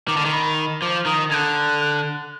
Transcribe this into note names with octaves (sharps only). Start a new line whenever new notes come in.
D#3 D6
D3
D#3
B5
F3 D6
D#3 D#6
D3 F#6 G#6